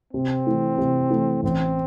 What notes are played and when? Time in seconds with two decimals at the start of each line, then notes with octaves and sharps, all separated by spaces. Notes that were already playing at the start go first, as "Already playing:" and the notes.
0.13 C3 C4
0.46 E3 A3
0.78 C3
1.10 E3 A3
1.43 A1 C4